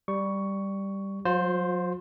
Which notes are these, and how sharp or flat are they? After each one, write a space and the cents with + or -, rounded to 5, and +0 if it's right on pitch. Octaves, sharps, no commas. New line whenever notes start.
G3 +0 C#6 +10
F#3 -35 F4 +40 C5 +0